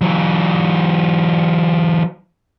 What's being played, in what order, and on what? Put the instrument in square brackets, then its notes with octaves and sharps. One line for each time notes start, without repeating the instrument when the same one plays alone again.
[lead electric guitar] E3 F#3